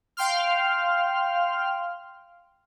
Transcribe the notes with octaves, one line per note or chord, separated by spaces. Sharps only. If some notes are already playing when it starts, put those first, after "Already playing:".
F5 G5 C6 F6